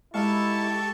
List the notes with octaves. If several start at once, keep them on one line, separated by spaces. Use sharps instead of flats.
G#3 D#4 E4 G4 A4 F5 A5 C#6